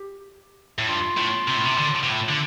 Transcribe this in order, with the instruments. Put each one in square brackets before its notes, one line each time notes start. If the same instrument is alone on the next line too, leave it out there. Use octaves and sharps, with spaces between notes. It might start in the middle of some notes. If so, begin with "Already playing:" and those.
Already playing: [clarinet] G4
[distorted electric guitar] A2
[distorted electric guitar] G2 [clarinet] F4
[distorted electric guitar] A2
C3
A2
C3
D3
C3
A2
D3